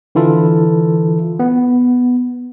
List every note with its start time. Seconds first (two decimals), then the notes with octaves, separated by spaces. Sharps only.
0.15 D3 E3 E4 F4 A4
1.39 B3